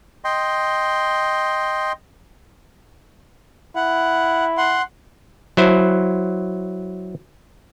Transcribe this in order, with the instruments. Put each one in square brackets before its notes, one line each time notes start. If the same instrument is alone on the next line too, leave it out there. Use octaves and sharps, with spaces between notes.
[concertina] D#5 G5 C6
[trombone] E4 [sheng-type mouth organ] F#5
[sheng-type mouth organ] F#5 C6
[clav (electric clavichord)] F#3 E4 C5